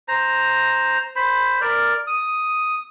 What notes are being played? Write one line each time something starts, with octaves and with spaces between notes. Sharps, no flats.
C5 A#5
C5 B5
A#4 D5
D#6